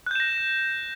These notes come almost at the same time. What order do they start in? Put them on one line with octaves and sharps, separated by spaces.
F#6 G6 E7 A#6